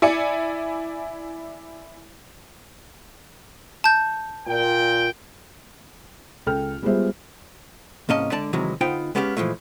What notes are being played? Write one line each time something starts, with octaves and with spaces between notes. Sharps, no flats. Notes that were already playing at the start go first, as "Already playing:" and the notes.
E4 D5 G#5 C#7
A5 G6
A#2 G5
C#2 A4 G5 F6
G3 G#3 B3 F4 C5 E5
C2 G#2 A#3 C#4 D#5 A5
D3 G#3 D5 A5
D#2 C3 D#3 E3 F#3 G#3
D3 B3 D#4 F4 C5 G5
G#3 B3 C#4 G4 D#5 F5
A#2 E3 F3 G#3 A3